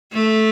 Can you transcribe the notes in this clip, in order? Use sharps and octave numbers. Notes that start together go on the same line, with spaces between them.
A3